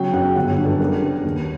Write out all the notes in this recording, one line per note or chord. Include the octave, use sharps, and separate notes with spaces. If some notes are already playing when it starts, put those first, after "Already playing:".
Already playing: C#3 F#3 G5
F#2 F#5
G1 F#5
G2
A4
G3 A#4
C#3
D#2